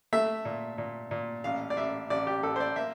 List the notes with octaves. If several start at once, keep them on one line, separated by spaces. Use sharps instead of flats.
A3 E5
A#2
A#2
A#2
A1 F5
D5
A1 E5
A1 D5
G4
A1 A4
C5
D5
A#3 E5